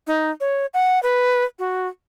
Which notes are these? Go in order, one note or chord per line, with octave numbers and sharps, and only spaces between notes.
D#4
C#5
F#5
B4
F#4